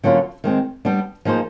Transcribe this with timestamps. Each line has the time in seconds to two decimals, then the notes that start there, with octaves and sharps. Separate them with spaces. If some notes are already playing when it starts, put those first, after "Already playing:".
0.04 D3 F#3 A#3 C#4 F4
0.44 D#3 G#3 C4
0.85 G3 B3 D4
1.25 F3 A#3 D#4 G#4 C5